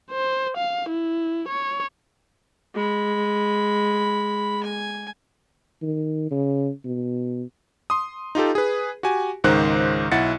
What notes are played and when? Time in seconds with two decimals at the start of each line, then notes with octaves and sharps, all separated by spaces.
0.11 C5
0.57 F5
0.89 E4
1.49 C#5
2.75 G#3 B5
4.63 G#5
5.83 D#3
6.31 C#3
6.85 B2
7.90 C6 D#6
8.35 D#4 F4 G4 A4
8.55 G#4 B4
9.03 F#4 G4 G#5
9.44 C#2 G#2 D#3 C5 F#6
10.11 B1 E4 F#5 A6 C#7